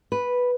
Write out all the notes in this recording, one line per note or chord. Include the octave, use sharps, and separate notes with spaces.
B4